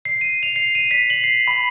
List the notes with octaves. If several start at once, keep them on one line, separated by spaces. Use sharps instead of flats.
C7
D#7
F7
C7
D#7
B6
F#7
C7
B5